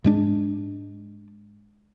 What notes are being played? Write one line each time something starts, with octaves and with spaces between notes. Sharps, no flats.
G#2 G#3 D4